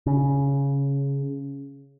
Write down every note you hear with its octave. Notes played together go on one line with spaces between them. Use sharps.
C#3